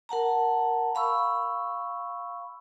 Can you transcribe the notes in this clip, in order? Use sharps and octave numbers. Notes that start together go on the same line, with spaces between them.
A#4 F#5 A5 A#5
F5 B5 C#6 E6